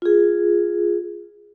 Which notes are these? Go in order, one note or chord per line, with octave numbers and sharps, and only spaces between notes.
F4 G#4